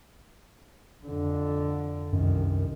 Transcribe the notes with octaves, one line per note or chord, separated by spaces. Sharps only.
F2 D3
C2 F#2 D#3